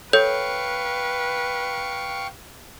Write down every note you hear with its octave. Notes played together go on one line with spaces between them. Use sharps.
A4 B4 C#5 F5 G5 C#6 G6